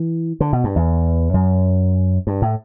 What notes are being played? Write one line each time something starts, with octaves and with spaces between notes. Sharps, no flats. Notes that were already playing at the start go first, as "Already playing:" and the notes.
Already playing: E3
D3
B2
G2
E2
F#2
G2
A2